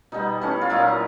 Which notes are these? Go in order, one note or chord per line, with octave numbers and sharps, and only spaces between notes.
B2 G3 B3 D#4
E3 A3 C#4
F4
A#2 F#3 A#3 D#4 E4